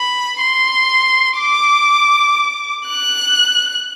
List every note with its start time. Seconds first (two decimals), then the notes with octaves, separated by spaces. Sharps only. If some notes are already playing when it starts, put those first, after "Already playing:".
Already playing: B5
0.40 C6
1.39 D6
2.87 F#6